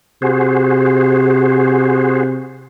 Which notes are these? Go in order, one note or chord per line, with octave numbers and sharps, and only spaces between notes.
C3 F#4 G#4 C5